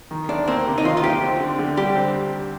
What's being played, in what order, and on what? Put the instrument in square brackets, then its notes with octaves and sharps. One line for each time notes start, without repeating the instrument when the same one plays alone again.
[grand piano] D#3
[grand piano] D2 [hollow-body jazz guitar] D4
[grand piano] A#3 [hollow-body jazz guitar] C4
[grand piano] C3
[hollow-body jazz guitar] D#4
[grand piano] D#3 [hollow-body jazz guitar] F4
[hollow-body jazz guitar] F4
[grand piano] D2 [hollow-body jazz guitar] G4
[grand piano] C4
D3
D3
[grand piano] G3 [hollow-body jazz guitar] G4
[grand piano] C4